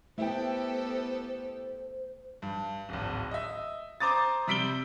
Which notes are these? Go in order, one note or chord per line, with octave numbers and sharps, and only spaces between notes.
A3 B3 E4 G4 A4 C5 G5
G2
D1 G#1
D#5 E5
C5 A#5 D6 D#6 A6
C3 G3 B6 D7 F#7 G7